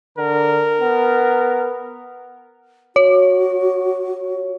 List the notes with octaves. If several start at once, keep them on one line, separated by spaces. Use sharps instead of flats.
D3 A#4
B3
F#4 C#5